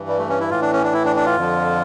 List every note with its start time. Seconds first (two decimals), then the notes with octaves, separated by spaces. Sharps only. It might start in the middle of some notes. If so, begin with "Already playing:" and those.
Already playing: G2 E3
0.08 G3
0.19 A3
0.30 C#4
0.40 E4
0.51 A2 E3 F4
0.62 D4
0.73 C#4
0.84 D4
0.93 E4
1.05 D4
1.16 D4
1.26 F4
1.37 F2 D3 F3